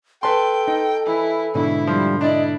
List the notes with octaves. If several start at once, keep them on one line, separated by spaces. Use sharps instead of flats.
A4 B4 G5 A5 C6
D#4
E3 E4
G#2 B2 D3 E4
F3 G3
D4 E4 D5 D#5